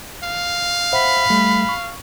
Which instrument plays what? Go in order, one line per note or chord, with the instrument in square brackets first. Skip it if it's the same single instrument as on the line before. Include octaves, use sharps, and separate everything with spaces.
[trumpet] F5
[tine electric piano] C5 E5 F#5 [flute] B5
[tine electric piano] G3 A3
C#6